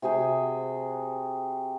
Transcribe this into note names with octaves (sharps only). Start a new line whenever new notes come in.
C3 F#4 G#4 G5